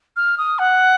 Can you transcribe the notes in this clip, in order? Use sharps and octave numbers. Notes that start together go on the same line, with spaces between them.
F6
D#6
F#5